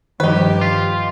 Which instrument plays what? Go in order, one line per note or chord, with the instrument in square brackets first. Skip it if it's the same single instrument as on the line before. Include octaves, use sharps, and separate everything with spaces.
[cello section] G2 G4 [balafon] D#3 F3 [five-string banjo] D#4 B4
[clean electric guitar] F4